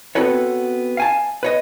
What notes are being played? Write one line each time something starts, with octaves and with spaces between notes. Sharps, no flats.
B3 C4 F#4 A4 B4 C#5
F5 G#5 A5
B4 C#5 D#5